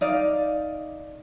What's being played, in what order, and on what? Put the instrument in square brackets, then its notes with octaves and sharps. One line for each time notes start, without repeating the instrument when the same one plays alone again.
[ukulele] D#4 D5 F5